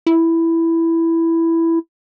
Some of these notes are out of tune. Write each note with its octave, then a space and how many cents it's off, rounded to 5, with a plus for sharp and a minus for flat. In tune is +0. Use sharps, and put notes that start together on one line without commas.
E4 +5